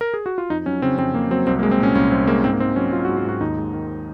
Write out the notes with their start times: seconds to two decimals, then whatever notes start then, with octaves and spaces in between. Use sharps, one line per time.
0.01 A#4
0.14 G#4
0.26 F#4
0.38 F4
0.50 F2 D#4
0.66 F#3 C#4
0.82 C#3 C4
0.98 F2 C4
1.14 F2 A#3
1.31 F#3 C4
1.47 C2 C4
1.59 A#3
1.63 G#3
1.71 C4
1.79 A#2 C#4
1.95 C2 C#4
2.12 C2 C4
2.27 G#3 A#3
2.44 G#2 C4
2.53 A#3
2.60 G#2 C4
2.76 F#3 C#4
2.92 F#3 F4
3.05 F#4
3.09 G#2
3.17 F4
3.25 G#2 F#4
3.41 D#2 D#4
3.57 G#3
3.73 D#3